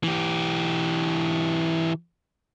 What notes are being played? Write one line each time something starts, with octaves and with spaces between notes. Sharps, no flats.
E3 G4